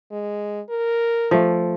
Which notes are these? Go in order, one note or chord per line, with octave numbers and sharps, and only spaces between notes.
G#3
A#4
F3 A3